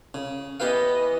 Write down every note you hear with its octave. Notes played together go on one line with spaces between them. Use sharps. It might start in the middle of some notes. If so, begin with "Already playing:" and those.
C#3
E3 B3 G4 B4 D#5 F5